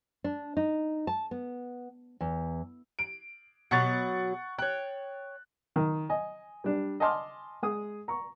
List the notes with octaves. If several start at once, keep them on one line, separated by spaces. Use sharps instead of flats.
D4
D#4
A5
B3
E2
D7
B2 F#3 F#5 C#6 A6
C#5 G5 F#6
D#3
D#5 G#5
G3 D4
D#5 G#5 A5 C6 D6 F6
G#3 G#4 D#6
A#5 C#6